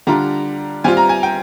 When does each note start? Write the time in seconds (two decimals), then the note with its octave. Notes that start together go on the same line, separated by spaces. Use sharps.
0.07 D3 G3 D4 F4 A#5
0.84 G3 C4 F4 G#5
0.97 A#5
1.09 G#5
1.23 G5